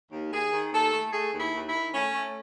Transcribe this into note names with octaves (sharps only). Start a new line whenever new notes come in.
D#2
D#2 G#4
D#3
D#2 A4
A3
A3 G#4
D#2
E4
D#2
E4
D#3
A3 C#4
A3